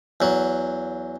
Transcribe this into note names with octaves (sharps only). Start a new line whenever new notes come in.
E2 F#3